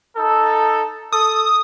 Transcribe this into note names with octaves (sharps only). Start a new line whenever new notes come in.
D#4 A4
A4 D#6